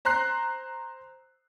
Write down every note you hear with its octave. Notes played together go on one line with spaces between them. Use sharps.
C5 A#5 C6 F#6 C7